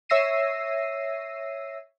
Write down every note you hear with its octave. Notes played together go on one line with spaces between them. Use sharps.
C#5 E5 E6 A#6 C7 D#7